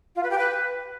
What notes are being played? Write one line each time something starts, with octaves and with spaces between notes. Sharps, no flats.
F4
B4
G4
B4